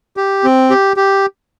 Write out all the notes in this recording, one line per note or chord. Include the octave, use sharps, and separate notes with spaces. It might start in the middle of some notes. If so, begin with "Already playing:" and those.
G4
C4
G4
G4